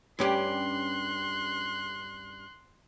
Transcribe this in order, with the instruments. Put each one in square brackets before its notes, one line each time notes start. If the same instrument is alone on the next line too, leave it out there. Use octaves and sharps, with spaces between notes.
[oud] G2 C#4 G4 [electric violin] C6 F#6